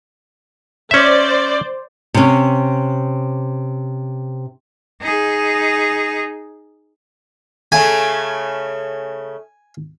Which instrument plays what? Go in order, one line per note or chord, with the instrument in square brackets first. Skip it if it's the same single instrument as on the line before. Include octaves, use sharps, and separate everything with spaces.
[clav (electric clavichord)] C#4 E5 [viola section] C5 D5
[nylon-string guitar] C3 C#4
[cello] D#4 G#4
[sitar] C#3 A3 [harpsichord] G#5